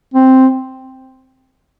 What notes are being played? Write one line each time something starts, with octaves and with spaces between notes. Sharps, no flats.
C4